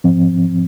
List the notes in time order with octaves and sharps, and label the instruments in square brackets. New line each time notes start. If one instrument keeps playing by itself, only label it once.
[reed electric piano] G#2 F3 C4